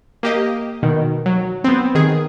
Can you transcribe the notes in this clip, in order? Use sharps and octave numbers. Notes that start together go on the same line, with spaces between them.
A#3 G4 D#5
B2 D#3
F#3
B3 C4
D#3 G#4